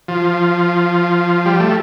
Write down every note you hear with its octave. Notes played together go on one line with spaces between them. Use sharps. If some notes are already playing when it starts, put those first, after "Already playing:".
F3
G3
A3